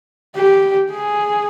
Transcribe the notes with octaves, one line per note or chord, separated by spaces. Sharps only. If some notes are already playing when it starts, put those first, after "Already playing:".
G4
G#4